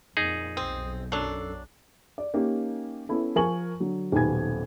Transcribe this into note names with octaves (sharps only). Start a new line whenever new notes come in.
F2 A#2 D#4 G#4
B1 C4 D#6
F#2 F#3 D4 A4 C7
D5
A#3 C#4 D#4 G4
B3 C#4 E4 A4
F3 A#4 G#5 C#6 F#7
D3 F#3
D#1 B1 D#3 B3 G#5 G#6